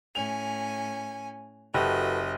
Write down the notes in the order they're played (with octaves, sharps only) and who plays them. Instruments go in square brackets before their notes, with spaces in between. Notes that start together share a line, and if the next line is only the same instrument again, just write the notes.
[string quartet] A2 C#4 G#5 [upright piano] F7
[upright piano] F#1 G4 [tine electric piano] F#4 A4 B4 [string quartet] D#5 E5